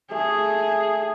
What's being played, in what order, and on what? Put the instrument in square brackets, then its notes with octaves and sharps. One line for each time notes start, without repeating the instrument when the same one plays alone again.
[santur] A3 [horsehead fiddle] G#4